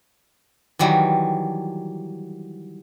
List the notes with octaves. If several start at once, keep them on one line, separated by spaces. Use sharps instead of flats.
D#3 E3 F#3 G3